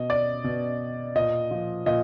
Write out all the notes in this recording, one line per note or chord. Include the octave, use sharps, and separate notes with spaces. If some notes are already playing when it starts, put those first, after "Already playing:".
Already playing: B2 D#5
D5
B2
A#2 D#5
F3
A#2 D#5